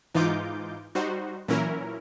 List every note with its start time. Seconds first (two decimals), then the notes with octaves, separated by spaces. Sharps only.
0.14 G#2 E3 D#4 F4 D6 G6
0.95 G3 D#4 F#4 C5
1.48 A#2 E3 F#3 C#4 E4 A#4